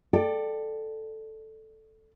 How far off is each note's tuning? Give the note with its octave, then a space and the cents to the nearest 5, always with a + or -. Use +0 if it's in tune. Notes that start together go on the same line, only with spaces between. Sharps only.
A4 +0 D5 +20 G5 +0